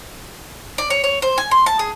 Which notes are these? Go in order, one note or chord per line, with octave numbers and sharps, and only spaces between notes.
D5
C#5
C#5
C5
G#5
C6
A5
G#4